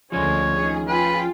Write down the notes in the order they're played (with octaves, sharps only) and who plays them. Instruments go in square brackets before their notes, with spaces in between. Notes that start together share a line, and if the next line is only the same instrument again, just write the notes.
[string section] D2 D3 G#3 [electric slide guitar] F3 C#4 [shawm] C#5
[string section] D#3 G#4
[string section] F4 G#4 G5 [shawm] B4